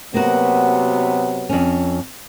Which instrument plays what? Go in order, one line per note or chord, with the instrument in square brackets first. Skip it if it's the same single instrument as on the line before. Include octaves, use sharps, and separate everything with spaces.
[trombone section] C3 F#3 B3 [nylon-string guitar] A#3 F#4
[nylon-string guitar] F2 C#4